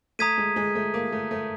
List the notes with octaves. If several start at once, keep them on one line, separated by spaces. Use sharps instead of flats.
A3 A#5 D#6 G#6 B6 D#7
G#3
G#3
A3
A#3
A3
A3